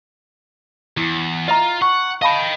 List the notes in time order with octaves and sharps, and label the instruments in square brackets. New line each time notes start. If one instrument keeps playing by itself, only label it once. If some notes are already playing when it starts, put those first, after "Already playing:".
[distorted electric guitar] E2 [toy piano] E4
[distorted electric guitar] F4 [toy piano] D#5 E5 A#5
[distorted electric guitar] F#5 [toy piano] C#6
[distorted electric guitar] D#5 G5 [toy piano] F5 A5 B5